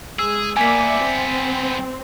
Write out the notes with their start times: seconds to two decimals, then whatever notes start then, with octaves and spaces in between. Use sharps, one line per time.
0.19 G#3 G#4 E6
0.57 G3 A#3 B3 D5 E5 G#5 B6
1.00 C4